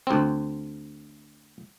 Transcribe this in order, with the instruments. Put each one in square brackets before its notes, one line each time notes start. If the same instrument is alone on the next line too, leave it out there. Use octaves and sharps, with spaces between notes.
[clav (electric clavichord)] D2 C4